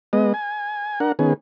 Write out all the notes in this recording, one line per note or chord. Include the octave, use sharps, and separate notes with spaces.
G#3 B3 D#5
G#5
D4 A#4 F#5
D#3 B3 C#4 G#4